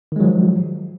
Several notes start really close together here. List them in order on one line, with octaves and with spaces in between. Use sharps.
D#3 G#3 F#3 F3